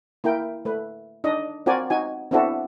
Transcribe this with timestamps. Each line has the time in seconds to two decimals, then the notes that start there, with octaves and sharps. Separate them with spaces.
0.24 A#3 E4 A#4 G5
0.65 A3 B4
1.24 D4 D#4 D#5
1.66 C4 F4 F#4 A#4 D5 G#5
1.90 D#4 F#4 G#5
2.31 B3 C4 D4 E4 F#4 A4